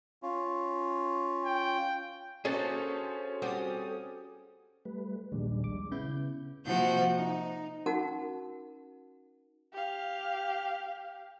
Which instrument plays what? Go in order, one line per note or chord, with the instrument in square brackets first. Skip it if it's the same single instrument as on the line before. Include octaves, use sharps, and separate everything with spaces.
[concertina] C#4 F4
[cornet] G5
[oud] A#3 D4 [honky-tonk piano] C#4 [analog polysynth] F#4 C5 [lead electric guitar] G#4 A4
[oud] G3 C4 F#4 [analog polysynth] D#6
[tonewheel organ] G3 A3 B4
[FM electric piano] A#1 D#2 [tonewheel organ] G3 G#3 D4
[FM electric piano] D6
[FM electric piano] C#3 B3 E4 [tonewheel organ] G6
[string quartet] C3 F3 A#3 F#4 F#5 G6
D#4
[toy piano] C#4 D#4 F#4 A#4 F#5 A5
[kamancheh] G4 F5